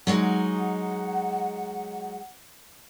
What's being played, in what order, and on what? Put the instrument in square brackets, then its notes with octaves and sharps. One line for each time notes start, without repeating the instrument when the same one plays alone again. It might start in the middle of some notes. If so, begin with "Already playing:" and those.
[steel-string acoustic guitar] F#3 G#3 D#4 [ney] F#5